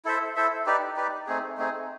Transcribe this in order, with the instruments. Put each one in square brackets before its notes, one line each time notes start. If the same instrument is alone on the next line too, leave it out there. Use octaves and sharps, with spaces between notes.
[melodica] E4 A4 C5 E5
E4 A4 C5 E5
D#4 G4 B4 D5
D#4 G4 B4 D5
A3 C4 D#4 G#4
A3 C4 D#4 G#4